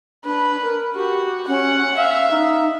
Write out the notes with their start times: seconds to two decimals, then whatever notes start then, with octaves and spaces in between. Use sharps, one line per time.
0.25 D4 B4
0.62 A#4
0.95 F#4 G4
1.48 C#4 F#5
1.97 E5 F5
2.31 D#4